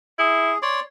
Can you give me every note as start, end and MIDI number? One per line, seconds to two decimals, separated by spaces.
0.19 0.52 64
0.19 0.58 68
0.62 0.80 73
0.62 0.80 74
0.62 0.80 84